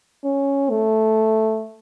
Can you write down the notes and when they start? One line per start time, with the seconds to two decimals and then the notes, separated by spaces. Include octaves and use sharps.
0.25 C#4
0.70 A3